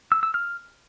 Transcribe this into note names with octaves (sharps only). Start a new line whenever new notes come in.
E6
E6
F6